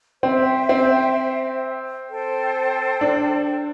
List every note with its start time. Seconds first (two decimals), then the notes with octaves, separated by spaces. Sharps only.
0.23 C4 C5 E5 G5
0.69 C4
2.08 A4 C5 G5
3.01 D4